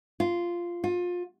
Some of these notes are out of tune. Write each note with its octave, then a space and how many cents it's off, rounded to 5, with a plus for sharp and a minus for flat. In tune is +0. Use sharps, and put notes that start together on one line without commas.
F4 -10
F4 +25